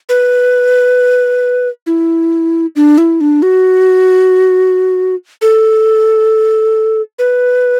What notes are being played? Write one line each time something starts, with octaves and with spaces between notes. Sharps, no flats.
B4
E4
D4
E4
D4
F#4
A4
B4